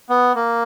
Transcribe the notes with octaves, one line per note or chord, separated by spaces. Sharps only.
B3
A#3